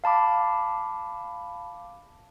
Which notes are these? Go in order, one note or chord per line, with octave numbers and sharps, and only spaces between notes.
F5 A5 B5 D6